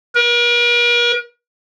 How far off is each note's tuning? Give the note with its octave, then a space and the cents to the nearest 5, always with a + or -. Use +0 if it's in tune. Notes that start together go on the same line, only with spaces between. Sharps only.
A#4 +45